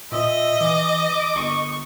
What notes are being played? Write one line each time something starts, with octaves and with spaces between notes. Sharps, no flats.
A#2 D#5 E5
E3 D6
G1 C#6